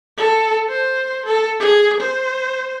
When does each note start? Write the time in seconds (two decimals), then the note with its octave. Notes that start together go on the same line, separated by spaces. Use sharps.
0.18 A4
0.70 C5
1.26 A4
1.60 G#4
2.01 C5